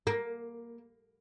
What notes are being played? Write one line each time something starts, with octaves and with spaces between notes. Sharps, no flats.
A#3